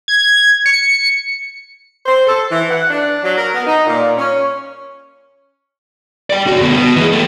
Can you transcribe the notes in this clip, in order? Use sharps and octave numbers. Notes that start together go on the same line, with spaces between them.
G#6
C#7
C5
A4
E3
F#5
D4
F#3
A#4
B3
D#4
A#2
C#4
D5 G5
C#3 F#4
D2 B2
B2
E3 G#3
A3 G4